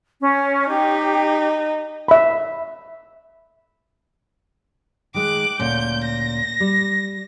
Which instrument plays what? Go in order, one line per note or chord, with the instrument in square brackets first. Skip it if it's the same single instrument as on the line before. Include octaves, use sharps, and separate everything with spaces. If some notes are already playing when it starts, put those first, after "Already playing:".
[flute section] C#4
[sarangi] D#4 [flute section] G4
[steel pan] E5 B5
[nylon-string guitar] D#3 G#3 [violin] D6 F#6
[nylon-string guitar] D2 A#2 C#4 [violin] G6
[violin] A#6
[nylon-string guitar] G3